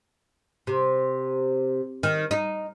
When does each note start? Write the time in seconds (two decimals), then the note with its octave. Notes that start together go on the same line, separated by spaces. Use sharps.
0.67 C3
2.03 D#3
2.31 D#4